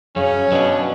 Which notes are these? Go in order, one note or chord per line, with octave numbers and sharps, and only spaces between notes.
F#2 C#3 C#4
B2 F#3 D4